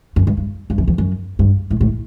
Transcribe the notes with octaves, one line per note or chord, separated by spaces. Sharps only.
F#2
G2
G2
G2
F#2
E2
F#2
G2
A2
A2